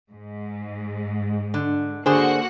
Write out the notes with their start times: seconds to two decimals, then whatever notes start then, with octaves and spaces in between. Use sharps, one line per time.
0.11 G#2
1.54 D3
2.06 D3 A#3 F#4 G#4 C5 F#5